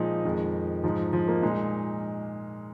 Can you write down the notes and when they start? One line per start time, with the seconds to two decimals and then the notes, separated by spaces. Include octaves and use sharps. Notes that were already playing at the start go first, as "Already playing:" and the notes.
Already playing: A#2 F3 G#3 D#4
0.25 F2 D#3 G#3
0.84 G#2 F3 G#3 D#4
1.13 F3
1.28 A#3
1.42 A#2 G#3 D#4